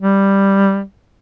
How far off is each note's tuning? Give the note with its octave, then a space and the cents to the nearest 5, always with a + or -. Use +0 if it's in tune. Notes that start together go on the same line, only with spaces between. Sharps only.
G3 +5